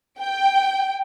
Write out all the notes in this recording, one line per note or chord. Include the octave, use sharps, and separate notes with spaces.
G5